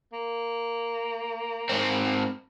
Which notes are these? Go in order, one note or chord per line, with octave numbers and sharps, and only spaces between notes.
A#3
G#2 C4